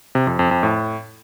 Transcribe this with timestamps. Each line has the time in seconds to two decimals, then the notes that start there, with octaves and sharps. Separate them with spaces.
0.15 C3
0.27 F2
0.39 F2
0.51 F2
0.63 A2